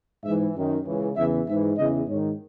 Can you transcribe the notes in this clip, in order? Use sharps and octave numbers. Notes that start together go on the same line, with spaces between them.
G#2 E3 E5
F#2 D#3
C#2 C#3 E3
E2 C#3 E3 E5
G#2 E3 E5
E2 C#3 E3 D#5
G#2 D#3 C#5